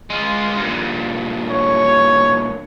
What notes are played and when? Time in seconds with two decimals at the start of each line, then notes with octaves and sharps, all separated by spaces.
0.10 G#3 F4
0.57 G2 A#2
1.50 C#5